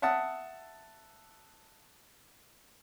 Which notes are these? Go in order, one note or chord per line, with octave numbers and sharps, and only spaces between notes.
E5 F#5 A5 D#6 E6